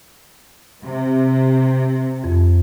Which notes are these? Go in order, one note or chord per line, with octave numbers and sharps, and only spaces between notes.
C3
F2